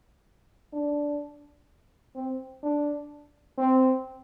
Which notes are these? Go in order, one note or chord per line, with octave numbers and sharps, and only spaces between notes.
D4
C4
D4
C4